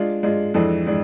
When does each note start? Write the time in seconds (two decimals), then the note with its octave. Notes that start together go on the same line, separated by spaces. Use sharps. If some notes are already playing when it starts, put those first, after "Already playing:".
Already playing: G#3 D4 F4
0.23 G#3 D4 F4
0.54 F2 E3 G#3 D4 A4
0.87 E3 G#3 D4